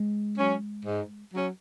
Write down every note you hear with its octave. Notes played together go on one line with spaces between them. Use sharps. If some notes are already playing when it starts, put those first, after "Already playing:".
Already playing: G#3
F#3 C#4
G#2
F#3 C#4